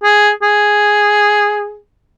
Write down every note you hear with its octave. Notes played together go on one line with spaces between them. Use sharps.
G#4
G#4